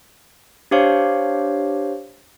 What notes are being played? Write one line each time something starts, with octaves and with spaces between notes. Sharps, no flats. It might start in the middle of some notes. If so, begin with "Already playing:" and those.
D4 G4 C5 C#5 F5